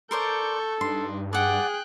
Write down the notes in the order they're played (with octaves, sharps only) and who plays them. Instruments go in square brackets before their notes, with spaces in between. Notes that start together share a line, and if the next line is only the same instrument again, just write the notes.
[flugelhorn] A4 [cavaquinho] A#4 C5 D5 [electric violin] C#6 G6
[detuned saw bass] G2 [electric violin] D4 D#4 [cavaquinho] C6
[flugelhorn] G#4 [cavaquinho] D5 F#5 [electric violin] G5 F#6